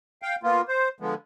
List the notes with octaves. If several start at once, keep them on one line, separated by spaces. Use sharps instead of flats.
F5 G5
A#3 B3 F4
C5
D3 F3 G#3 B3